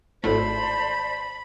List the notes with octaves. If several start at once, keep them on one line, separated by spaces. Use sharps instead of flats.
G#1 A2 A3 A4 C5 D5 A5 B5